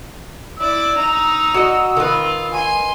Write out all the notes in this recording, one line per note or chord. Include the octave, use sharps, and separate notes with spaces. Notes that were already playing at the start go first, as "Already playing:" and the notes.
E4 D5 E6
D#4 A#5
F#4 D#5
D#3 F4 B4
G#5 C6